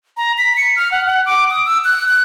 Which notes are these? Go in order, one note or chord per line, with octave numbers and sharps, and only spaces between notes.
A#5
B6
C#7
F6
F#5
F#5
D6
D#6
E6
F#6
F#6